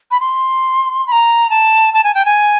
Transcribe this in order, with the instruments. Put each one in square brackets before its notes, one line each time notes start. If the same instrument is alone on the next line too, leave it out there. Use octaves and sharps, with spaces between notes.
[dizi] B5
C6
B5
A#5
A5
A5
G#5
G5
G#5